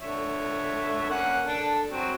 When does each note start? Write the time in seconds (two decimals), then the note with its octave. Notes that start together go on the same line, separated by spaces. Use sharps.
0.01 D3 C#5 E5
1.10 A#3 C#4 F#5
1.47 D4 A4
1.92 F#3 C4 F#4